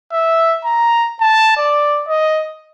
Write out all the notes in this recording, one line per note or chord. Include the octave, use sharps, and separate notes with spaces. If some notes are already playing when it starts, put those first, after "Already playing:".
E5
A#5
A5
D5
D#5